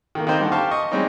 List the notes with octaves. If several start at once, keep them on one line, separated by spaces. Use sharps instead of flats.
D#3 A3 A#3
D#3 A#3 C4 D#4 C5
D3 G3 F#5 A5
G4 C5 F5 A5 C#6
D#5 C#6
G3 G#3 C4 C#4 D#4